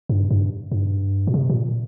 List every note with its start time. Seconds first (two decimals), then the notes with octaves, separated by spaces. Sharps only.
0.09 G2
0.31 G2
0.72 G2
1.27 A#2
1.34 C3
1.50 A#2